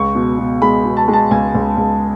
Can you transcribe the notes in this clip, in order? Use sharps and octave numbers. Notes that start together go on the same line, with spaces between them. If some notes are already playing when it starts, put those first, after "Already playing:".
Already playing: C#2 C#6
B2
B2
G#3 B5
B2
A5
G#3
A5
C#2 G#5
C#2
C#2